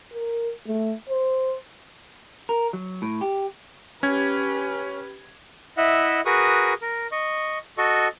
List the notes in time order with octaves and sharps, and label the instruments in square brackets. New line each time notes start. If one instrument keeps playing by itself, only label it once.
[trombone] A#4
A3
C5
[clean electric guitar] A#4
F#3
A2
G4
[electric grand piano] C#4 G#6 [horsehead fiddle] G4 B4
[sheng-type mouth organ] E4 D#5 E5 F#5
F#4 G#4 A#4 B4 C#6 D#6
A#4
D#5 C#6
F#4 A4 D#5 C#6